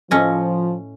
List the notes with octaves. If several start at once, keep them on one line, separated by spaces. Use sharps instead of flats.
A2 F3 C#4 D#5